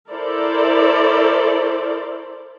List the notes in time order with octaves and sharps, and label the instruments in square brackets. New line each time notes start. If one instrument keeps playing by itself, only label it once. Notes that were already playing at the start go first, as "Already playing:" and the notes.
[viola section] E4 A4 A#4 C5 D5